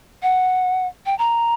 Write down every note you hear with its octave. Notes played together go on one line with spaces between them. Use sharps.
F#5
G5
A#5